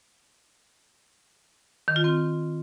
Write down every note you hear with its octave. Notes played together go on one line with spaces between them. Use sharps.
D#3
F4
C4